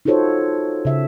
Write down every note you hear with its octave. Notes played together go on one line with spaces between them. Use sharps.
D#4 F4 F#4 A4 C5 C#5
C#3 E5